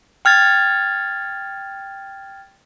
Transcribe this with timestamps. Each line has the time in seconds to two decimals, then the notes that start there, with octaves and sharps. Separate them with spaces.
0.25 G5 F6 G#6 A6